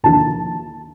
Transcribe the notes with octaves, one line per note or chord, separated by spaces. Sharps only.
D#2 D3 F3 A5